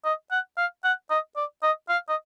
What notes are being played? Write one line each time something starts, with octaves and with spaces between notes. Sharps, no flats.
D#5
F#5
F5
F#5
D#5
D5
D#5
F5
D#5